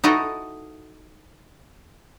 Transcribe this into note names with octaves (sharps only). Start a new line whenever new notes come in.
D#4 E4 F#4 A4 B4 D#5